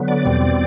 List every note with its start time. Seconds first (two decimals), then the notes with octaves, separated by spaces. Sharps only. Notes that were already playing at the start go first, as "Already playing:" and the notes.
Already playing: D3 F#3 B3
0.08 D5
0.25 E2 B2 G3 C4